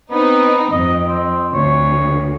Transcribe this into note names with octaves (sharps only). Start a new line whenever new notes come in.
B3 C4 D#4
F2 D#5
C4
D2 C#5